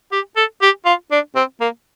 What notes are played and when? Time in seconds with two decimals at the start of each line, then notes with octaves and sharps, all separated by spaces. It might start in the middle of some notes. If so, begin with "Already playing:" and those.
0.12 G4
0.36 A4
0.62 G4
0.86 F4
1.11 D4
1.35 C4
1.61 A#3